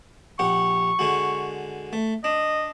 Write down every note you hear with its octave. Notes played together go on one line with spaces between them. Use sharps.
A#1 G4 F#5 C#6
D3 G#3 F#4
A3
D4 D#5